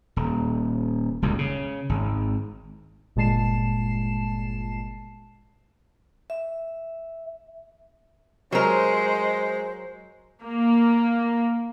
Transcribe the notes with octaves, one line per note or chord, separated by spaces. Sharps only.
D#1
D#1 C#2 F#2
C#3
G#1
G1 A#2 G#3 A5 C7 E7
E5
F#3 G#3 A#4 C5
A#3